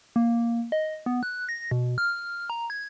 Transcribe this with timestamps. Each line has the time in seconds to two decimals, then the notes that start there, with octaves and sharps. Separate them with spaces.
0.16 A#3
0.72 D#5
1.06 B3
1.23 F#6
1.49 A#6
1.71 B2
1.98 F6
2.50 A#5
2.70 G#6